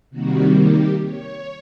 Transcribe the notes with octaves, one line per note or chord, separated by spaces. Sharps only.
C3 D#3 G3 A#3 F#4
G4
C#5